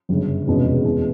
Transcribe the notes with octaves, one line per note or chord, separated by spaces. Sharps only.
G1 F#2 C#3
F1 E2 B2 G#3 C#4
E2 B2 G#3